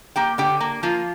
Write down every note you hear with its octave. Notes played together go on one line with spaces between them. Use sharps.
A#3 G4 G5
D3 G4 G5
A#3
F3 A#3 F4